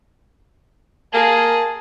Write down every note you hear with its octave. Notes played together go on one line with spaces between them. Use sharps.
A#3 G#4 A5